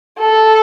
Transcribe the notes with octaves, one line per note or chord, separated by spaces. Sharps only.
A4